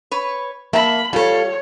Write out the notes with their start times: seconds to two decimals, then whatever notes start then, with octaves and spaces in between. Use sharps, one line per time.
0.11 B4 C#5
0.73 A#3 E5 A5 B5
1.13 G3 F4 A4 C#5